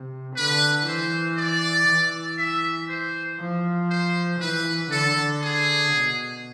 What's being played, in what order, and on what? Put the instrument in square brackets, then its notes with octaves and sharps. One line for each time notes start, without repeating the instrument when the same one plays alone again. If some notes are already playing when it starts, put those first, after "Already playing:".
Already playing: [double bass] C3
[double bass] D3 [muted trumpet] B4
[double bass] E3 [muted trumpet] C5
[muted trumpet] D5
[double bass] E3
[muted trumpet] E5
C5
[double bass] F3
[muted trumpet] C5
[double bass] E3 [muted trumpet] B4
[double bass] D3 [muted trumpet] A4
[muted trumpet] G#4
[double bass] B2